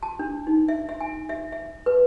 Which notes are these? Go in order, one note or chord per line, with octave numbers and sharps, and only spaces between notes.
A5
D4
D#4
E5
E5
G#5
E5
E5
B4